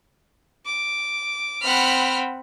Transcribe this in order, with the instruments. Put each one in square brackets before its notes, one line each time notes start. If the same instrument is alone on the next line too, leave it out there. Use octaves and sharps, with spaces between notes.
[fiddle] D6
[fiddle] C4 [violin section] F#5 B5 F6